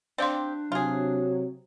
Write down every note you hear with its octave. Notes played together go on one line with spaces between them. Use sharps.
C4 D4 G4 D5 F5 C6
C3 F#3 F4 G#4